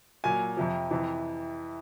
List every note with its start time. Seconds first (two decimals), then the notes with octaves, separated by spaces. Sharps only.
0.24 A#2 F#3 G#5
0.57 F2 C3 F3
0.91 F2 C3 E3